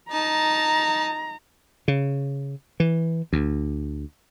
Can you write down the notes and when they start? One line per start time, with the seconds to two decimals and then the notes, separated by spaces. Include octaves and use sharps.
0.11 D#4 A5 A#5
1.88 C#3
2.80 E3
3.33 D2